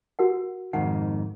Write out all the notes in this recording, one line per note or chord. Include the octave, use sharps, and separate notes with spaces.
F#4 A#4 F#5
F2 G#2 D#3 F#5